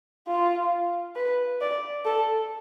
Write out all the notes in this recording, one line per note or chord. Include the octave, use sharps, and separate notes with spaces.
F4
B4
D5
A4